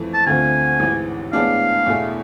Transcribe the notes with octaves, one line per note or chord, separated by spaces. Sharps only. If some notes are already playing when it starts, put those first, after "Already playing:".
Already playing: F2 E3 A3
A5
D2 D3 A3 C4 F4 G#5
A1 G#2 E3
A2 G#3 B3 D4 G#4 F5
E2 B2 A3 E4 G#4